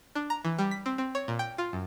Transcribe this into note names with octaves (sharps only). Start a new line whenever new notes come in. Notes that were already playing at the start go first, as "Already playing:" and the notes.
D4
A#5
E3
G3
B6
C4
C4
C#5
A#2
G5
F4
F#2